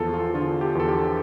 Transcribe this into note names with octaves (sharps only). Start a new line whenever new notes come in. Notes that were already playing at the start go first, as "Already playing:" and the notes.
Already playing: E2 F3 F4 A4
F4
D3 F4
G4
E2 A4
G4